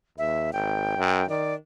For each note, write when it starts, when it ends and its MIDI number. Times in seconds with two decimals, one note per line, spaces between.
0.18 0.48 39
0.18 0.53 76
0.53 0.94 32
0.53 1.28 79
0.97 1.23 42
1.29 1.56 51
1.29 1.55 74